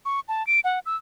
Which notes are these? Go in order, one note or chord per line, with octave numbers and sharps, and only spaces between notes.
C#6
A5
D7
F#5
E6